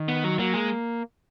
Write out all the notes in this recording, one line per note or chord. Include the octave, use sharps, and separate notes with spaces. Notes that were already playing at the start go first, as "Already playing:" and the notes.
Already playing: D#3
B3
F#3
F#3 A#3
G#3